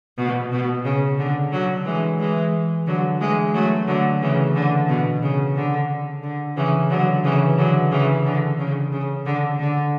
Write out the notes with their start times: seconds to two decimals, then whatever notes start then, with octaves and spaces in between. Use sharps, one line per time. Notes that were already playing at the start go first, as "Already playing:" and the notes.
0.18 B2
0.52 B2
0.85 C#3
1.18 D3
1.52 D3 F#3
1.85 E3 G#3
2.19 E3 G#3
2.87 D3 F#3
3.20 E3 G#3
3.54 F#3 A3
3.87 D3 F#3
4.21 C#3 E3
4.55 D3
4.88 B2
5.22 C#3
5.55 D3
6.23 D3
6.56 C#3 E3
6.90 D3 F#3
7.24 C#3 E3
7.57 D3 F#3
7.91 C#3 E3
8.25 D3
8.59 C#3
8.92 C#3
9.26 D3
9.59 D3